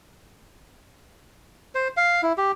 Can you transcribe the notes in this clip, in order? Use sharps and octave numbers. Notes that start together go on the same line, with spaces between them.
C5
F5
E4
G4